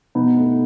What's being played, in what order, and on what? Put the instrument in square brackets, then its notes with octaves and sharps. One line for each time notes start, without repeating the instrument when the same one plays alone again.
[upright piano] B2 B3 D#4
A3